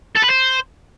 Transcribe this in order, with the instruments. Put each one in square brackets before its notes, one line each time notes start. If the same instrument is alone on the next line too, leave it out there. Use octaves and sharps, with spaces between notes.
[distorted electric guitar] A4
B4
C5